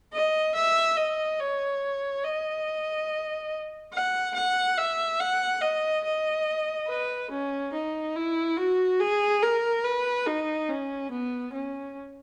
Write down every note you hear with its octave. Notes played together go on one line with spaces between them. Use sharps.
D#5
E5
D#5
C#5
D#5
F#5
F#5
E5
F#5
D#5
D#5
B4
C#4
D#4
E4
F#4
G#4
A#4
B4
D#4
C#4
B3
C#4